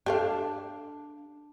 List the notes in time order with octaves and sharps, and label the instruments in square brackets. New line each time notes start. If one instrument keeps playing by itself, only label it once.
[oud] D4 [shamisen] G4 A4 F5